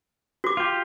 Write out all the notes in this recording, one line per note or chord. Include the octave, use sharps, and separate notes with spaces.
F#4 D6
F4 G4